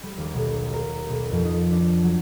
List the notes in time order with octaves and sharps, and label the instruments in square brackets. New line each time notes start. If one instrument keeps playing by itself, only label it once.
[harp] G3
D#2
B1
A#4
B1
F2
D#4
D4
F#3